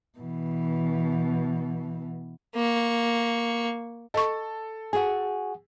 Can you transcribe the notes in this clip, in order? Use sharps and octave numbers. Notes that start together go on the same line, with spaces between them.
B2 E3
A#3 C#6
A4 D#5 C#6
F#4 G#4 F#5 G#5